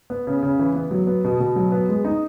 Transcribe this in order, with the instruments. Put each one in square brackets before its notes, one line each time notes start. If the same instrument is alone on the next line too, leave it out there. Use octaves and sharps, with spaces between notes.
[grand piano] B3
C#3
C#3
E3
B3
F#3
B3
B2
B2
F#3
B3
G#3
D#4